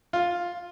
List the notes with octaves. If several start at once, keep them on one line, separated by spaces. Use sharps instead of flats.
F4